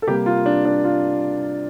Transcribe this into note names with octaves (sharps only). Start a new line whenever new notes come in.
A4
C3 G3 A#3 G4
F4
D4
D4
F4